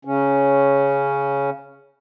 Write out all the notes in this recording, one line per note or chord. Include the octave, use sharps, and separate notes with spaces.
C#3 C#4